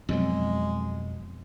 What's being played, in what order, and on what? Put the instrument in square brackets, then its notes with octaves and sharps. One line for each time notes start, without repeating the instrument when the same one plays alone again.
[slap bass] F2 B2 F#3 [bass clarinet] G#3